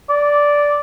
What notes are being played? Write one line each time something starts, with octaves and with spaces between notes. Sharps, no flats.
D5